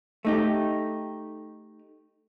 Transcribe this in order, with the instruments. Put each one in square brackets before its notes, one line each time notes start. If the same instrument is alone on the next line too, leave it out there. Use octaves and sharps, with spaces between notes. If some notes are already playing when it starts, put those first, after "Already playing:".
[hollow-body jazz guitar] A3 D#4 G4